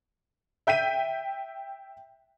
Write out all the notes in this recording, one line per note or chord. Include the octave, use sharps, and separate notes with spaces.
E5 G5 G6 B6 D#7